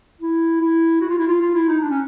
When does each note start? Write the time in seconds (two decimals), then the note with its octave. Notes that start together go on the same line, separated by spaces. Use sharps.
0.21 E4
0.61 E4
1.01 F#4
1.09 F4
1.18 E4
1.27 F4
1.41 F4
1.54 E4
1.68 D#4
1.81 D4
1.90 C#4